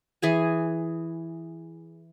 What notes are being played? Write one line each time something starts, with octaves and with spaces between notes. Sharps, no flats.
E3 G#4 G#5